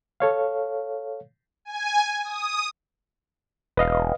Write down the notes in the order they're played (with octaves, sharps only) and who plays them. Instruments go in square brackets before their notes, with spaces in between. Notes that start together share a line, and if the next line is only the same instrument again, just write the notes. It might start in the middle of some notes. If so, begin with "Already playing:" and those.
[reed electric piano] A4 C#5 F5
[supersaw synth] G#5
D#6
[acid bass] E1 [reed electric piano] B4 D#5 F5